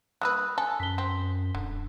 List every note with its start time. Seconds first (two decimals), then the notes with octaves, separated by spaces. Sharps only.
0.21 G3 A#3 B4 D#6 E6 F#6
0.58 A4 G#5
0.80 F#2 B6 G7
0.98 C4
1.55 D#1 D3